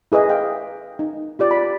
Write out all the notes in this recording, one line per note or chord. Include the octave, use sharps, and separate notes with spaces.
E4 G#4 B4 D#5
F5 G5
D#4
F4 G4 D5
B5